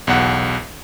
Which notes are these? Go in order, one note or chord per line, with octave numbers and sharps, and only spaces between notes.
B1 E2 F#5